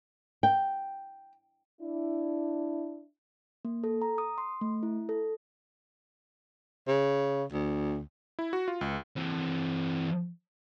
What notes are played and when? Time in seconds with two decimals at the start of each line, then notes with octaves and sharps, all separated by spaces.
0.43 G5
1.82 D4 E4
3.65 A#3
3.84 A4
4.02 A#5
4.18 D#6
4.38 C6
4.61 A3
4.83 E4
5.09 A4
6.87 C#3
7.52 D2
8.39 E4
8.53 F#4
8.68 F4
8.81 C#2
9.16 E3 C4